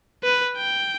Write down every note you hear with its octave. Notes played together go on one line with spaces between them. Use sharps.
B4
G5